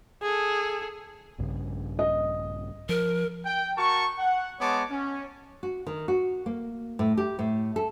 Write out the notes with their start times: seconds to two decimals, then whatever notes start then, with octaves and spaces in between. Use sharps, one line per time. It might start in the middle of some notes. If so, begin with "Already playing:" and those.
0.23 G#4 A4
1.38 A#1 G2 C#3
1.99 D#5
2.89 F3 A#4
3.45 G5
3.77 F#4 A#4 A5 C#6
4.19 F#5
4.60 G#3 B3 C#5 A5 D6
4.91 C#4
5.63 F#4
5.87 D#3
6.08 F#4
6.46 A#3
6.99 A2
7.17 G4
7.39 A2
7.76 A4